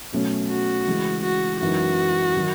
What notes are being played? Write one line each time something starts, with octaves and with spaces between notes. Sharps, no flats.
B2 F#3 A3 C#4
F#4
C#3 E3 G#3
F#4
F#2 E3 G#3 D#4 F#4
D#3 F#3